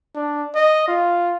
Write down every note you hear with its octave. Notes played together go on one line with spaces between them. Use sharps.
D4
D#5
F4